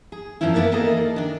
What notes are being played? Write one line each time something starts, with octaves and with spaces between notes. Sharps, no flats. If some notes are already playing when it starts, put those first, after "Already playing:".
G#4
F#2 B2 E3 F3 C#4 E4
A#3 B3 D#4 E4 A#4 D5
D#3 E3 A#3 G#4 A4 D#5
D#3 D4